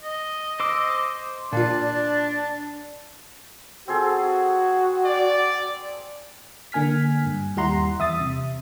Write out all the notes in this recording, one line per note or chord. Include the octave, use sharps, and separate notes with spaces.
D#5
C5 D6 E6
A#2 D4 F4 A5
C4 F#4 G#4 A4
D5
D3 A#3 G#5 F6 B6
G2
D#2 G3 E4 F#5 A#5 C6
E2 E5 D#6 A6
C3